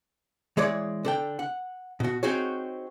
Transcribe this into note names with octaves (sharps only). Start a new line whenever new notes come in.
E3 G#3 G#4 C#5 D5
D3 A4 G5
F#5
B2 F#4
C4 D#4 F#4 G#4 C#5